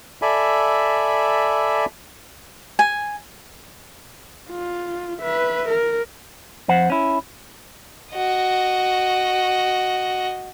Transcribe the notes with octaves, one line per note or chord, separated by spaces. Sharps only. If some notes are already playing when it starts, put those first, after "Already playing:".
A4 D5 E5 G#5 B5
G#5
F4
B4 E5
A#4
F2 F3 C5 F#5
C#4 E4
F#4 D#5